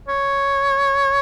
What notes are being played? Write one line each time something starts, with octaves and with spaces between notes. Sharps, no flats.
C#5